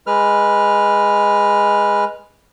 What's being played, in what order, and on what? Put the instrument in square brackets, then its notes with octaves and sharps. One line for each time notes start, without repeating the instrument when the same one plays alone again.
[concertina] G#3 B4 F6